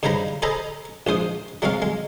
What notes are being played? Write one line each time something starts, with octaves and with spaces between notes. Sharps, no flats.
G2 C#3 D#4 C5 A#5 B5
G#4 A4 C5 D#5 A#5 B5
A#1 G#2 C5 D#6
F#3 G#3 C4 C#4 F5
G#3